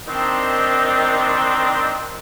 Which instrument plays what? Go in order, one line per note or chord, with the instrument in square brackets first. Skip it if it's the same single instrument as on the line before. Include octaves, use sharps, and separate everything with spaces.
[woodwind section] D#3 C4 D4 D#4